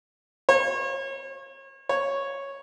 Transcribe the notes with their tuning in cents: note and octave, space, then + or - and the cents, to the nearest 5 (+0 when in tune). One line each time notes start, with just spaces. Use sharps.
C#5 -35
C#5 -5